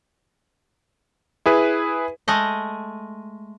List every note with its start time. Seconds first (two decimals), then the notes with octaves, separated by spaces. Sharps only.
1.46 E4 G#4 B4
2.28 G#3 A3 D#5